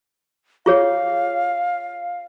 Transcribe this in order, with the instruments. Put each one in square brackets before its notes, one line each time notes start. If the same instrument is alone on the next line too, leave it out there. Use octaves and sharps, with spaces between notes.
[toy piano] F4 G#4 C#5 [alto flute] F5